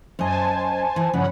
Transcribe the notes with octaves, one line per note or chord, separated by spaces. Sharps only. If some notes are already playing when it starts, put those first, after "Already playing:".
F#2 C5 D#5 G#5 A5
E3
G2 C#3 F3 C#4 F#5 B5